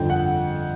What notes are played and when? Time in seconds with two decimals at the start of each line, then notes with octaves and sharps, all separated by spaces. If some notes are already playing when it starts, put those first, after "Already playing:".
Already playing: G1 F2 D3 F3 G5
0.10 F#5